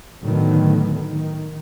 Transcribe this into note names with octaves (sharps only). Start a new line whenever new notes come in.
A2 D3 D#3 F#3 A3 B3
D#3